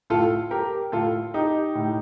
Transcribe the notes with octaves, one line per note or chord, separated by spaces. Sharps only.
A2 F4 A4
G4 A#4
A2 F4 A4
D#4 G4
A2